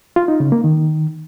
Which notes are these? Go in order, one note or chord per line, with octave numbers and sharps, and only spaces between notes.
F4
D#4
C#3
A#3
D#3